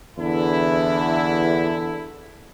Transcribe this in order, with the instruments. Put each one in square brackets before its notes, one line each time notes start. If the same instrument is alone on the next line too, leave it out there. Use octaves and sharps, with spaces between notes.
[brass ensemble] E2 D3 E4